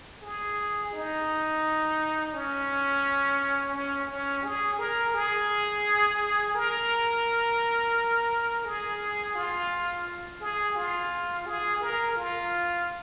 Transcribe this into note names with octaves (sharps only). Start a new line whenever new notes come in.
G#4
D#4
C#4
C#4
C#4
G#4
A#4
G#4
A#4
G#4
F4
G#4
F4
G#4
A#4
F4